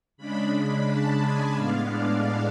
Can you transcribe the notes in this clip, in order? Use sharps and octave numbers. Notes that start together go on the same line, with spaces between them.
C#3 G#3 D4 B5
A5
G#5
A2 G#3 B3 D4 F5
D5